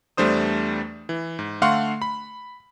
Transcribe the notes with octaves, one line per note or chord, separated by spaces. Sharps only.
E2 G3 A3 D4 C5 D#6
E3
G#2
D3 A3 F5 F#5 C6 C#6
B5